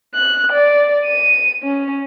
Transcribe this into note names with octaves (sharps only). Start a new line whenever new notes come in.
F#6
D5
D#7
C#4